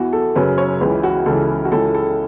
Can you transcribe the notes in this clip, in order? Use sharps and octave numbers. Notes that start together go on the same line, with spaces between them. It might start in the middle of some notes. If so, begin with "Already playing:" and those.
Already playing: E2 E3 F#4
A4
F#2 C#3 F#3 B4
C#5
C#2 C#3 E3 B4
F#4
C#2 C#3 E3 A4
F#4
C#2 C#3 E3 A4
A4